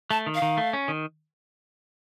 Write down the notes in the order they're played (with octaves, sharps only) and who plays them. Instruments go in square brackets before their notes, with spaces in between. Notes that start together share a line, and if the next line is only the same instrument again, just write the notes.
[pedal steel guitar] A3 [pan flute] A5
[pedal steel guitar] D#3
[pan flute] F5
[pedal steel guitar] D#3
A3
C#4
D#3